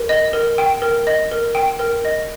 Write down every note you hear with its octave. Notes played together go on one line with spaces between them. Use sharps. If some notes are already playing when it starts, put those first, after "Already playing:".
Already playing: A#4
D#5
A#4
G5
A#4
D#5
A#4
G5
A#4
D#5